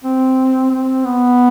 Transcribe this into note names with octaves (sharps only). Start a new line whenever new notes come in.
C4
C4
B3